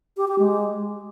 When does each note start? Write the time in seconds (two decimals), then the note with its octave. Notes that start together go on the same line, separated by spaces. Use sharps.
0.17 G4
0.28 G4
0.39 G#3